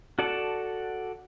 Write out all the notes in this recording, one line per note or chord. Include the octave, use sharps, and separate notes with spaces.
F#4 A4 D5 F#5 A5